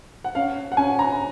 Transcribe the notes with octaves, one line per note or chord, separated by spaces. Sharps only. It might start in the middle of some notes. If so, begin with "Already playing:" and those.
F#5
C#4 F5
F#5
C#4 G#5
A#5